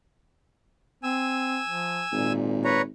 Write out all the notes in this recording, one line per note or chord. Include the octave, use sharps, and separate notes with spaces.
C4 G#5 E6
F3
G#1 A#2
B4 C#5 A#5